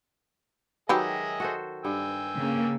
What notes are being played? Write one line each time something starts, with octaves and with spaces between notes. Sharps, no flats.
D#3 F#3 G4 G#4 B4 D#5 E5
F#4 A4 C5
G2 G5 G#5 E6
C#3 A#3